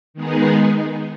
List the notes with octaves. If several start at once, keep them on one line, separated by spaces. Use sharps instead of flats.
D#3 G#3 B3 D#4 G#4